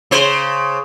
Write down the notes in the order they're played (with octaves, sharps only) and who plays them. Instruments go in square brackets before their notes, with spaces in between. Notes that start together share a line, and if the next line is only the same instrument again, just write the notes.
[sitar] C#3 C5